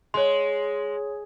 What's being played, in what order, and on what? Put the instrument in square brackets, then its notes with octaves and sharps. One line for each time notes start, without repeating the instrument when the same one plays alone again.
[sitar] G#3 [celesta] C#5 C6